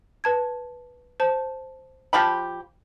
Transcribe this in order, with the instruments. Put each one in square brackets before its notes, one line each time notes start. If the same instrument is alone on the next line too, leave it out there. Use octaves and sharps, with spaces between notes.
[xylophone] B4 A5 G#6
C5 A5
[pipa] F3 G4 B5